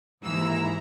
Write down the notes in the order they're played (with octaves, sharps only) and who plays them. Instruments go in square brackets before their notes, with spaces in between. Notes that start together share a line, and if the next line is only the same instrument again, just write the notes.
[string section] D#2 E3 E6 [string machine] G#2 E4 A#5